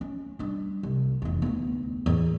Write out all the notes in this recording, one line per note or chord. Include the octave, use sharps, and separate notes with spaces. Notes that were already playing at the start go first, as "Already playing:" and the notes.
C#4
G3 D4
C2
F1 E2
D2 B3
E2 A2